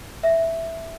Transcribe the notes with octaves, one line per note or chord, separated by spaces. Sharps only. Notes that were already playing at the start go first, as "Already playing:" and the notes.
E5